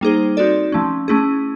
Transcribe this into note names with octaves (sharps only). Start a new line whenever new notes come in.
G3 A#3 D#4 G#4 C5
C4 D#4 F#4 A4 D5
F3 A3 C#4
A3 C#4 E4 G#4